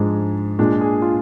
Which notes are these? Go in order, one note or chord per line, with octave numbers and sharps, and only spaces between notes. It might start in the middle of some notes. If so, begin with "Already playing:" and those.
Already playing: G#2 F3 G#3 D4
A#2 G#3 D4
G#4
F4